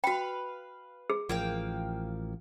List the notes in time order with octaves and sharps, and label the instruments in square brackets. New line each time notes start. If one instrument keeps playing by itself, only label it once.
[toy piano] F#4 G5 [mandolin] B4 F5
[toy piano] G#4
[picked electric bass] A1 F3 [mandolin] A#3 F5 G5